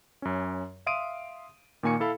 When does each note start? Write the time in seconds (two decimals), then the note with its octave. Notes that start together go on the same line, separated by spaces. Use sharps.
0.22 F#2 C#4
0.86 E5 F5 C6 D#6 D7 D#7
1.83 A#2 D#3 A#3 G#5 C#6 C#7
2.00 E4 A4 F5 B5